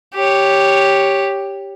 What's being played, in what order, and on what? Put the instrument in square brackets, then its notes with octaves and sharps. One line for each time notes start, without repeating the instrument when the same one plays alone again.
[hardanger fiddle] G4 C#5